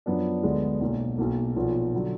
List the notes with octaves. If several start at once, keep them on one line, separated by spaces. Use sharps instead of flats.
F#2 F3 B3 D4
D2 D3 G#3 B3 D4
B1 B2 A#3
B1 B2 A#3
B1 A#2 F3 B3
D3 F#3